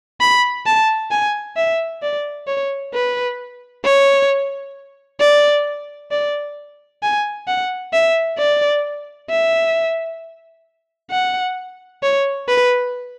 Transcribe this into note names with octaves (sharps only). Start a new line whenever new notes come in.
B5
A5
G#5
E5
D5
C#5
B4
C#5
D5
D5
G#5
F#5
E5
D5
E5
F#5
C#5
B4